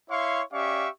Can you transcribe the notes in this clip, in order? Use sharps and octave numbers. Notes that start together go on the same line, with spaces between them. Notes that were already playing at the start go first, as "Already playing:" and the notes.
E4 C#5 E5 F5 C6 C#6
C#4 G4 D5 E5 F5 C#6